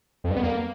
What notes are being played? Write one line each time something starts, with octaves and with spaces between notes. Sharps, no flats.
F2
G2
B3
A#3